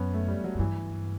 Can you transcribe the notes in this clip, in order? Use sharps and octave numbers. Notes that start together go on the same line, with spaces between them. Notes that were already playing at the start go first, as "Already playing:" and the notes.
Already playing: F#2 B3 C#4
A3
G3
F#3
F#2
G2 E3